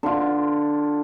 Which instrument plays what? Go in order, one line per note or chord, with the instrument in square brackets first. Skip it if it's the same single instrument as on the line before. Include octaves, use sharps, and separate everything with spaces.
[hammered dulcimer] D3 F4